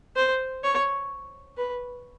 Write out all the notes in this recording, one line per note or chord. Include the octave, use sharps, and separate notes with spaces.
C5
C#5
B4